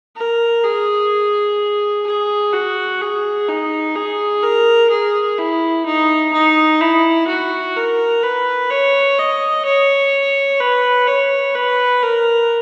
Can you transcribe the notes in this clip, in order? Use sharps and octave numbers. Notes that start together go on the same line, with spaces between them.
A#4
G#4
G#4
F#4
G#4
D#4
G#4
A#4
G#4
E4
D#4
D#4
E4
F#4
A#4
B4
C#5
D#5
C#5
B4
C#5
B4
A#4